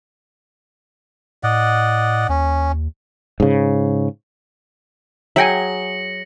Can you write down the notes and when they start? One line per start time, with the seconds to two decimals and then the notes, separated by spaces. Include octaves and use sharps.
1.43 A2 D5 D#5 F#5
2.29 D#2 C#4
3.40 G#2 C#3
5.36 F#3 G#4 E5 G5 G#5 A#6 C#7 F#7